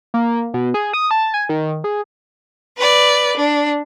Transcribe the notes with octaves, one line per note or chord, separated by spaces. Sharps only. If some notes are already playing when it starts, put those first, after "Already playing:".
A#3
B2
G#4
D#6
A5
G#5
D#3
G#4
B4 D5
D4